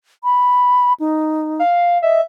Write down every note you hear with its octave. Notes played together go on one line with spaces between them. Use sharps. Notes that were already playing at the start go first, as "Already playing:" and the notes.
B5
D#4
F5
D#5 E5